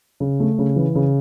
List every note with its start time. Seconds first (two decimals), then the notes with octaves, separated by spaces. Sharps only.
0.20 C#3
0.40 A3
0.59 C#3
0.76 E3
0.95 C#3